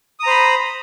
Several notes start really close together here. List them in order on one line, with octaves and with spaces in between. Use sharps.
D#6 A#5 C5 B5